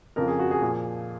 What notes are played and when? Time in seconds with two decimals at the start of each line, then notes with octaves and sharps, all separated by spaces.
0.16 F2 C#3 F3 A#4
0.27 G#4
0.39 F#4
0.51 G#4
0.61 A#2 F3